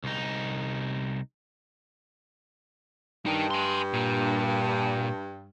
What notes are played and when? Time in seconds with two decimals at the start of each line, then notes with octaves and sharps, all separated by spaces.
0.04 C2 D#4
3.26 G2 D#4 A#4
3.51 G#5 C6
3.93 A#2